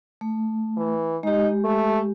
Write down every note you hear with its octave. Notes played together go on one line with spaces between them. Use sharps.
A3
E3
G#3 D#4 G4
A3